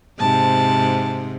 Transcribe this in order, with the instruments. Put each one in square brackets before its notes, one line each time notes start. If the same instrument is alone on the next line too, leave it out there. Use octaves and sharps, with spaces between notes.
[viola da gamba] G#2 C3 [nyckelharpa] A5